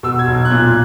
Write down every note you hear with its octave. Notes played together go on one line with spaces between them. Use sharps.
B2 E6
G#6
B1
F#6
A#2 G#6